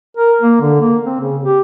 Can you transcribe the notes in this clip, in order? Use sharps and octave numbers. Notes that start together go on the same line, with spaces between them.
A#4
A#3
D3
A#3
C4
C#3
G4